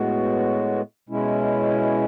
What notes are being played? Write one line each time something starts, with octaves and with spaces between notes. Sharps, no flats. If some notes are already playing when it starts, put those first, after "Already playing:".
Already playing: A2 G#3 B3 F#4
B2 G#3 C#4 E4